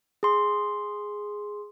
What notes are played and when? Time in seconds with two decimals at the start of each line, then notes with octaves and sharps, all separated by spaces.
0.23 G#4 C6